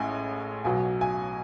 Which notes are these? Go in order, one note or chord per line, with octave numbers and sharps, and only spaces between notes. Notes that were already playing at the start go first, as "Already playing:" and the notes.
Already playing: A1 A2 G#3 G#5
B1 B2 F#3 G#5
G#5